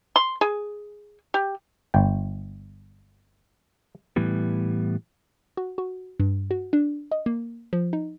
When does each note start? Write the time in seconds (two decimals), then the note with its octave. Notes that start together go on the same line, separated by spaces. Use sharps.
0.16 C6
0.41 G#4
1.34 G4
1.94 G1 G5
4.16 A2 E3 G3 B3
5.57 F#4
5.78 F#4
6.20 G2
6.51 F#4
6.73 D4
7.11 D#5
7.26 A#3
7.73 F3
7.93 D#4